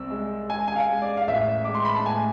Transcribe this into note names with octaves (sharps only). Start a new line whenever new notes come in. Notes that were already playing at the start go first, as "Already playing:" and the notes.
Already playing: C2 C4 E6
G#3
G#3 G#5
G#5
F5
G#3
D5
F5
A1 E5
G#3 D6
C6
B5
A5
A2 G#5